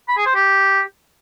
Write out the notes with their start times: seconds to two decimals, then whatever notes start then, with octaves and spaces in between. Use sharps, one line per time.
0.08 B5
0.17 G#4
0.26 C5
0.35 G4